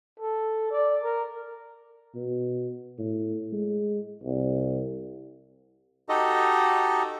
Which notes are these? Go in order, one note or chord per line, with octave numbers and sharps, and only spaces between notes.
A4
D5
A#4
B2
A2
G#3
C2
D#4 F#4 G4 A4 D#5